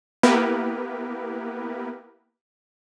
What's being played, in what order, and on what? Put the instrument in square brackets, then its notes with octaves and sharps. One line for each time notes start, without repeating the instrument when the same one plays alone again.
[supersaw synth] A#3 B3 E4 G4 A#4 B4